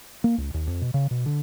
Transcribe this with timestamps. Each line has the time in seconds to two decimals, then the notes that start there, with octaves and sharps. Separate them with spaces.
0.24 A#3
0.38 C#2
0.54 D#2
0.67 F2
0.81 B2
0.94 C#3
1.11 B2
1.26 D3